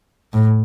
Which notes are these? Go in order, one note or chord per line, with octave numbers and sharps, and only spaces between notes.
A2